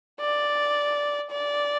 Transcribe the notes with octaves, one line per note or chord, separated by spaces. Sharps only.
D5
D5